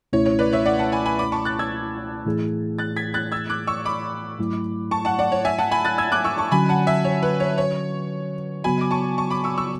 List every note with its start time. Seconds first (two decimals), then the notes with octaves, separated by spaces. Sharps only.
0.13 C#2 B2 A3 C#4 E4 C#5
0.26 C#5
0.39 B4 D5
0.52 C#5 E5
0.66 D5 F#5
0.79 F#5 A5
0.92 G#5 B5
1.06 G#5 B5
1.19 B5 D6
1.32 A5 C#6
1.45 F#6 A6
1.59 E6 G#6
2.26 A2 E3 A3 E4 G#4
2.79 F#6 A6
2.97 G#6 B6
3.14 F#6 A6
3.32 E6 G#6
3.50 D6 F#6
3.67 C#6 E6
3.85 B5 D6
4.39 G#2 F#3 A3 E4
4.91 A5 C#6
5.05 F#5 A5
5.19 D5 F#5
5.32 C#5
5.45 E5 G#5
5.58 F#5 A5
5.71 G#5 B5
5.85 F#6 A6
5.98 E6 G#6
6.12 D6 F#6
6.24 C#6 E6
6.38 A5 C#6
6.52 D3 F#3 C#4 F#4 G#5 B5
6.69 F#5 A5
6.87 E5 G#5
7.05 C#5
7.23 B4
7.40 C#5
7.58 C#5
8.64 C#3 F#3 B3 F#4 G#5 B5
8.81 D6
8.91 A5 C#6
9.18 A5 C#6
9.30 B5 D6
9.44 C#6 E6
9.58 C#6 E6